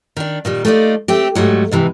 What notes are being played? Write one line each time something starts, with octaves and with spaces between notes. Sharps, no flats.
D#3 D4
A#2 D#3 G3
A3 A#3 D#4 F4 D5
A3 C4 G4
G#2 F#3 G3 A3
G#2 C3 E3